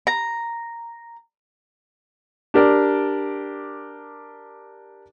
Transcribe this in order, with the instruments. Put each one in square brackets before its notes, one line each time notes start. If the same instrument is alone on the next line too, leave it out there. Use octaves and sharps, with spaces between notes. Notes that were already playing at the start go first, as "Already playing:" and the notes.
[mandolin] A#5
[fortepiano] D4 G4 A#4 D5